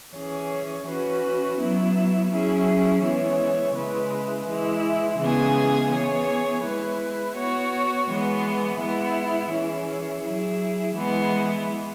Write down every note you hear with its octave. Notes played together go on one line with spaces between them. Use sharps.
E3 C#4 G#4 C#5
E3 C#4 F#4 B4
F#3 B3 E4
F#3 C#4 E4 G#4
E3 G#3 B3 E4 C#5
C#3 G#3 E4 B4
E3 G#3 E4
C#3 E3 G#3 B3 G#4
E3 B3 G#4 C#5
G#3 E4 B4
B3 F#4 C#5
E3 G#3 B3
G#3 B3 E4
E3 C#4 E4 G#4
F#3 E4 G#4
E3 G#3 B3 E4